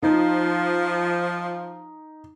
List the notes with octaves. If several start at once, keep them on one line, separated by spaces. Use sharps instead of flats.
F3 D#4